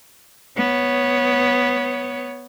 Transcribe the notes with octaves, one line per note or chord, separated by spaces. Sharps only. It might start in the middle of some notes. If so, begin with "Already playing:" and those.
B3 C#5